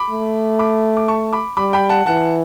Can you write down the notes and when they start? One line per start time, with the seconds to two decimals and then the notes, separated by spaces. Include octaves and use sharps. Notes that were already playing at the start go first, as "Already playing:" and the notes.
Already playing: B5 D6
0.10 A3
0.59 B5 D6
0.97 D6
1.08 A5 C#6
1.33 B5 D6
1.57 G3 B5 D6
1.73 G5 B5
1.89 F#5 A5
2.06 E3 F#5 A5